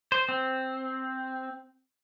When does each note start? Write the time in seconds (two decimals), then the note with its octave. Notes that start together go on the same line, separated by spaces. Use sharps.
0.12 C5
0.29 C4